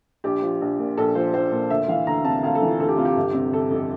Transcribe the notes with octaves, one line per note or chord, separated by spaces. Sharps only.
A#1 G4
F3
A#1
A#2
A#1 A4
F3 C5
A#1 C5
A#2
D2 E5
E3 F5
D2 A#5
C3 A5
D2 F5
A4
E3
F4
D2 A4
G4
C3 F4
G4
G1
C3
G1 A4
F2